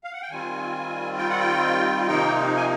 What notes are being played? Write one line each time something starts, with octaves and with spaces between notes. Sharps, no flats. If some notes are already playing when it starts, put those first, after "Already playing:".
F5
F#5
G5
D#3 G3 C4 F4 G#5
G5
F#5
G5
C3 F3 A#3 D#4 G5
G#5